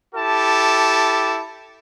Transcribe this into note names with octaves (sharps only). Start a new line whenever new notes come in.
E4 G4 A4 A5